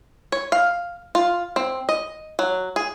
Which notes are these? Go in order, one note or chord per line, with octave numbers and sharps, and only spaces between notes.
C#5
F5
F4
C4
D#5
F#3
G#4